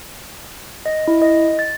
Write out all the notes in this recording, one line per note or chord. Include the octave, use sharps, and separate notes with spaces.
D#5
E4
D#5
A6